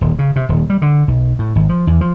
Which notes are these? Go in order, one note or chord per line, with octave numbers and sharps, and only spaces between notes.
D#1
C#3
C3
D#1
G3
D3
B1
A2
G#1
F3
E2
F3